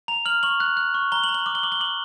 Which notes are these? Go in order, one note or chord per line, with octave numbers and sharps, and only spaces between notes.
A#5 F7
F6 F#7
C#6 F#7
F#6
F#6
C#6
A#5 G7
F#7
A#5
F#7
D6 F#7
G7
D6 F#7
G7
D6 F#7